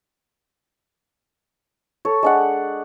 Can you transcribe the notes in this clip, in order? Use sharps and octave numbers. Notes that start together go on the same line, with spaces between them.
A4 C#5
G#3 D4 F#5